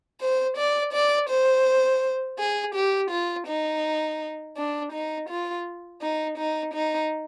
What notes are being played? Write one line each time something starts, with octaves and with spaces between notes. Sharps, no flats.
C5
D5
D5
C5
G#4
G4
F4
D#4
D4
D#4
F4
D#4
D#4
D#4